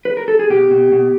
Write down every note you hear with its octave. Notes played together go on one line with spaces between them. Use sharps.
B4
A#4
A4
G#4
B2 G4
B2
B2